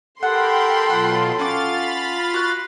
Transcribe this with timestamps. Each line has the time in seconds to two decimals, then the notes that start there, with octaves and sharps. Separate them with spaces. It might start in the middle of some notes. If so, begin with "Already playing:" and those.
0.23 G4 A4 A#4 F#5 G5 B5 C6
0.90 B2 F#3 F4 F#5
1.39 C#4 F4 F5 F#5 D6 A6
1.81 B5
2.34 F#4 F#6